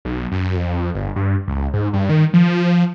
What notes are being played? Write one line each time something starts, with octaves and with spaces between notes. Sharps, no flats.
B1
F#2
F2
G1
G2
C#2
G#2
G2
D#3
F3